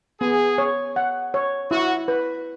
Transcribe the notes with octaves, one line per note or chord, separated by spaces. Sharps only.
B3 G#4
C#5
F#5
C#5
E4 F#4
B4